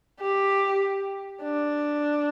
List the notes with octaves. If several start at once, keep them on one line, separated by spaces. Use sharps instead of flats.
G4
D4